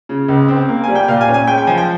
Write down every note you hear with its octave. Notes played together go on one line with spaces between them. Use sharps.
C#3
C#2
C4
A#3
G3 G#5
G5
A#2 F5
G#5
C#4
G#5
G#3 G5
G5
F3 G#5
G5